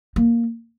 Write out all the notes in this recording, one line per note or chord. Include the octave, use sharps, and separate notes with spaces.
A#3